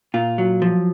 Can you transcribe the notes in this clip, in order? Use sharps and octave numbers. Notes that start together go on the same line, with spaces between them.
A#2 F4
F#3
F3